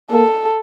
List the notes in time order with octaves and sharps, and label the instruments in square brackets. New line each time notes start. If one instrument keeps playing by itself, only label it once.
[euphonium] A#3 [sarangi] A4